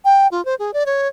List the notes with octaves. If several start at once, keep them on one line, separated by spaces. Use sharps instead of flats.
G5
F4
C5
G#4
D5
C#5